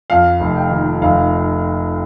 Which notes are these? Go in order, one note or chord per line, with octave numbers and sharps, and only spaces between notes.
F2 F5
F1
G5
D#3
F1 F5